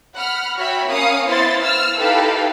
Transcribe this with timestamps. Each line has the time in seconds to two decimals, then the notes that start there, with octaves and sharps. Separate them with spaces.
0.16 F#5 B5 F6
0.59 F#4 C#5 E5 G5 B5
0.90 A#3 C#4 F5 D#6 C#7
1.28 B3 E4 C5 F5 C6 A6
1.62 E6 F6
2.00 D#4 E4 G4 A4 B4 F5